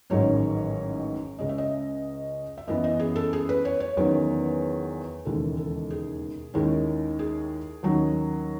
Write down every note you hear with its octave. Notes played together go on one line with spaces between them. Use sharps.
A1 G#2 D#3 F#3 C#4 C#5
C#2 C#3 G#3 C#4 D#5
E5
D#5
E5
F#2 E3 B3 D#5
D#5
G#4
A4
G#4
B4
C#5
C#5
E2 D#3 F#3 C#4 C#5
E1 D#2 C#3 E3 G#3 A4
A4
G#4
D#2 D#3 G#3 C#4 E4
G#4
D#2 D#3 F#3 C#4